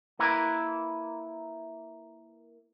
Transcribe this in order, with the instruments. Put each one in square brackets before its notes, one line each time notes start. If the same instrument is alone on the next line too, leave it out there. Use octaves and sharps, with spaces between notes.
[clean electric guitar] A#3 E4 A#4 B4